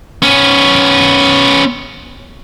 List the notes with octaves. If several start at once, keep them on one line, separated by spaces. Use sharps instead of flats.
B3 C#4